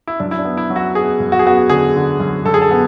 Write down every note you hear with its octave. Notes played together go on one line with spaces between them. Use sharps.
E4
F#2 D4
E4
D4
B3
E4
F#3
F#4
B3 G#4
F#2
F#4
G#4
B3 F#4
D3 G#4
D3
F#2
F#2 A4
G#4
A4
B3